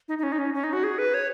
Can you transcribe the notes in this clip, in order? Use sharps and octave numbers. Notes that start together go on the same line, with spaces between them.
D#4
D#4
C#4
D#4
C#4
C#4
D#4
F#4
G#4
B4
C#5